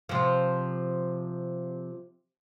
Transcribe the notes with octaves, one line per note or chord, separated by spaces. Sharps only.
C3 F3